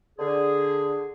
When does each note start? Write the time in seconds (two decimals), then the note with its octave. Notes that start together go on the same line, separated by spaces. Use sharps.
0.19 D3 G#4